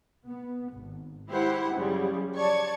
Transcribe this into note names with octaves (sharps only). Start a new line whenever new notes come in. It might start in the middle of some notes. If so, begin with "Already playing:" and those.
B3
G#1
G#3 E4 G4 C5 F#5
F#2 C#3 F3 G3
C#5 D5 A5 C#6 G#6